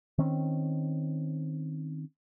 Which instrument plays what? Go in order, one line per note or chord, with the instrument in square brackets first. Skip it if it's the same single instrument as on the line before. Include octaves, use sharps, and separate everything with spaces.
[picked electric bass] D#3 C4 C#4